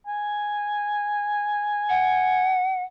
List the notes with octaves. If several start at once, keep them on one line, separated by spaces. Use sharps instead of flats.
G#5
F#5